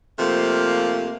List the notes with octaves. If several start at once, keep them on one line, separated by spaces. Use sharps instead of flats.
C3 F3 A3 A#3